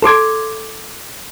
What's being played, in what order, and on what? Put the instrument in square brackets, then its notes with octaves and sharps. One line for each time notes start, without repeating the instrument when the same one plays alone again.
[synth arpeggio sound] A4 C6 D6 G#6